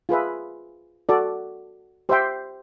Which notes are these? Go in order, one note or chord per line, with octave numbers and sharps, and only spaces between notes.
F4 G#4 B4 E5
F#4 A4 D5
G4 C5 E5 G5 C6